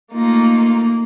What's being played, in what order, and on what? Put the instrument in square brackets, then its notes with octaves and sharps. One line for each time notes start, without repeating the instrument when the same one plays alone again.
[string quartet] A3 D#4 F4 [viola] A#3